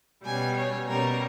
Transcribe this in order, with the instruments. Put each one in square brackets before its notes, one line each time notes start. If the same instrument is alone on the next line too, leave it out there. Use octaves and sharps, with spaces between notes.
[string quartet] B2 G3 C#4 G#5
C#5
B2 G3 C#4 A#4